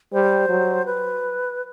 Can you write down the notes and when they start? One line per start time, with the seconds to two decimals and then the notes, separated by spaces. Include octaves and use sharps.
0.13 G3 C5
0.49 F#3
0.86 B4